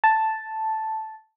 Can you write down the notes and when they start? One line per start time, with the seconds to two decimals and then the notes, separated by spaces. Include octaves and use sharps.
0.04 A5